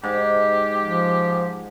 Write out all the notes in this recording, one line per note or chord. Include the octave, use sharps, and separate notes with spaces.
G#2 G4
F3